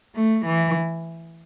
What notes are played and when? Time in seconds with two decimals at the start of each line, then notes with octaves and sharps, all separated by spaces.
0.15 A3
0.46 E3